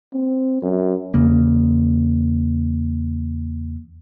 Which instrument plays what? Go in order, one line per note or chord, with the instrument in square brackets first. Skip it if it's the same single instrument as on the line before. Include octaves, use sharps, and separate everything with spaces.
[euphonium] C4
F#2
[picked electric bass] E2 C#3 A#3